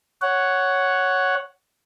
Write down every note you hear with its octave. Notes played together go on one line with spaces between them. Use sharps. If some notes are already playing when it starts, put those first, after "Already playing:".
C#5 F#5